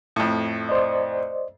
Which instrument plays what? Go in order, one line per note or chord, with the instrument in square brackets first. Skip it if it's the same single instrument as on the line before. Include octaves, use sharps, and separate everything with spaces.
[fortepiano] F2 A2
[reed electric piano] C5 D5 D#5